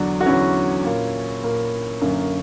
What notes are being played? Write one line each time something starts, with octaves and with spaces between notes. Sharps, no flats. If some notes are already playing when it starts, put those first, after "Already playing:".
Already playing: E2 D3 F#3 D4 F#4
F#4
E2 D3 F#3 C#4 E4
A#2 A#3
A#2 A#3
F#2 D3 A#3